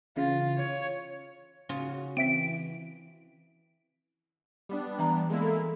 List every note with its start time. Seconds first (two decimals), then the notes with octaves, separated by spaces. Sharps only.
0.17 C#3 E3 F4
0.58 C#5
1.69 C#3 C#4 F4 F#4
2.17 E3 C4 E5 B6 D7
4.69 G3 B3 D4
4.99 E3 A#5
5.30 G#3 A#3 E4
5.42 A4